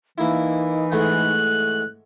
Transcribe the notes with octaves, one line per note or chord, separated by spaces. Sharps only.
E3 A#3 D#4 E4
E2 G#2 A3 F#6